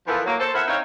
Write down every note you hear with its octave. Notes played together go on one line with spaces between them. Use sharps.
E3 F3 B3 F4 A4 A#4
F#3 A#3
A4 C5
B3 E4 A#4 E5 F#5
C4 D#4 E4 C#5 E5 F5